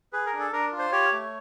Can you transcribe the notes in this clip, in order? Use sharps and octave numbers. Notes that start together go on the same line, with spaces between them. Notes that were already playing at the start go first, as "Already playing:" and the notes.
G#4 B4
A#4
D4
A4
D4 A#4
F4
C5
G4 C#5
A3